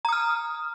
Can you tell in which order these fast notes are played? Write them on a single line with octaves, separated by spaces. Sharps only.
A#5 D#6 F6